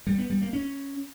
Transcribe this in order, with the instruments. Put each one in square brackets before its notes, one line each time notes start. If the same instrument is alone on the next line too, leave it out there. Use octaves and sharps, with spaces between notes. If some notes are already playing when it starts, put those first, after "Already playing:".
[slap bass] G3
B3
G3
A#3
C#4